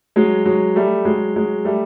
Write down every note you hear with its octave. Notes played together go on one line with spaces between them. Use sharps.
F#3 G#3
F#3 G#3
G3 A3
F#3 G#3
F#3 G#3
G3 A3